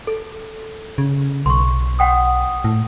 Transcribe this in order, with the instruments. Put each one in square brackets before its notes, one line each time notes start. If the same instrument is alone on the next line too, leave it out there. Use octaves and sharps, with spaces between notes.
[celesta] A4
[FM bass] C#3
[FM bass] B1 [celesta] C6 C#6
[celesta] F#5 G5 D#6
[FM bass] A2